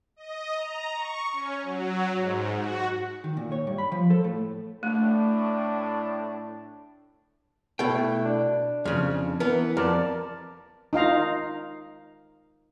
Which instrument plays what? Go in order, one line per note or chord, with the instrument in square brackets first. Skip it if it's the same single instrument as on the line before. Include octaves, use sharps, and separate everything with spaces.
[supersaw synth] D#5
A#5
C#6
C#4
F#3
G#2
F#4
[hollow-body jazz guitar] D#3
A#2
C#5
G2
B5
F3
A4
A2
[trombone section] A2 D4 [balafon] A3
[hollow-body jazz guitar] B2 G5 [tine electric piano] A3 E4
[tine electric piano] D4
[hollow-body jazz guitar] F2 C#3
[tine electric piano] E3 [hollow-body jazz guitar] B3 A#4
[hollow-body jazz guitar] F2 [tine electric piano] A#4 D5 A5
[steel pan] D#4 F4 F5 A#5